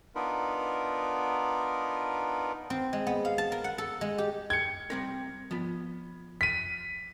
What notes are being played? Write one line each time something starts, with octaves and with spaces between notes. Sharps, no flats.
B3 D4 D#4 F4 A#4 B4
C4
G#3
B3
F5
A5
A#4
F#5
A4
G#3
G4
G5 G#6 C#7
G3 C4 A#4
F3 B3
B6 D#7